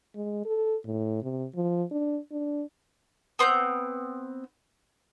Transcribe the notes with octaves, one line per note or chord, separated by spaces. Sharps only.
G#3
A4
A2
C3
F3
D4
D4
B3 C4 F#6 G6